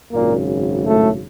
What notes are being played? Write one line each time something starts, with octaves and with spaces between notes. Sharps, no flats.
G#1 F#2 A#2 C#3 A#3
A2 A3